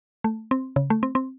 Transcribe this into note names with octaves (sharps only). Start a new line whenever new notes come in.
A3
C4
C#3
A3
C4
C4